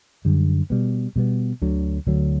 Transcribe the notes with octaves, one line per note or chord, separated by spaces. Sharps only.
F#2 D3 G3
B2 G3 B3
B2 G3 B3
D2 D3 F#3
D2 D3 F#3